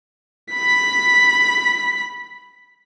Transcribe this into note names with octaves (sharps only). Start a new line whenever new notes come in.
B5 B6